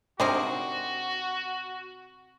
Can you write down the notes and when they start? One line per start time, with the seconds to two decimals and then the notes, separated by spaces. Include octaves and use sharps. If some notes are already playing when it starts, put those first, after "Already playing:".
0.20 C3 D4 D#4 F#4 G#4 A#4 C5